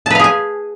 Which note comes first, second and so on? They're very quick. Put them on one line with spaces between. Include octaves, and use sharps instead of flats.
A5 B4 F5 G#4 G#5